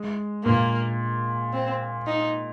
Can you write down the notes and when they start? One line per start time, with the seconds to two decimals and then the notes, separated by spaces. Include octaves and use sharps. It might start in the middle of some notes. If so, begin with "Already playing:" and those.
Already playing: G#3
0.45 A#2 A#3
1.53 C4
2.07 D#4